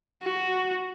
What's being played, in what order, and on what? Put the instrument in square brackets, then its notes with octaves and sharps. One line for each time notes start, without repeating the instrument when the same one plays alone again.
[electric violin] F#4